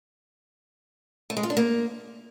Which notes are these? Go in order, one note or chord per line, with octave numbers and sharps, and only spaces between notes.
A3
G#3
F4
D4
A#3